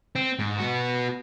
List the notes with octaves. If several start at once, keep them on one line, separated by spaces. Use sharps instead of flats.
C4
G#2
B3 F#4